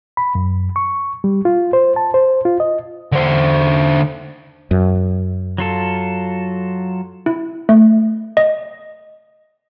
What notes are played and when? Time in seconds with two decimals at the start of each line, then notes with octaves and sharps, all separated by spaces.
0.17 B5
0.35 F#2
0.76 C#6
1.24 G3
1.45 F4
1.73 C5
1.96 A5
2.14 C5
2.45 F4
2.60 D#5
3.12 D3 C5
4.71 F#2
5.58 F#3 F4 A4
7.26 E4
7.69 A3
8.37 D#5